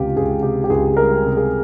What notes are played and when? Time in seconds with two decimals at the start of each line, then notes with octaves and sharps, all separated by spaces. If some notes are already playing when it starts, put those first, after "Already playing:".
Already playing: C#2 C3 F4 G4
0.16 C#2 G#4
0.43 C3 G4
0.64 G4
0.70 C#2 G#4
0.96 G3 A#4
1.24 C3
1.37 G#4